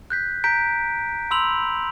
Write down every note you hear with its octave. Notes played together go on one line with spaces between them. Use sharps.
F#6 G6 B6
A#5 G6 B6 D7
B5 C6 E6 F7 F#7